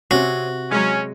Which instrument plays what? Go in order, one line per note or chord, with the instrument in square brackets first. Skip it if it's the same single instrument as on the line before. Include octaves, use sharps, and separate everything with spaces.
[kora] C3 [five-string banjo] C4 C#4 [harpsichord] F#4
[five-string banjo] E3 F#3 [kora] G#3 [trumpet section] C#4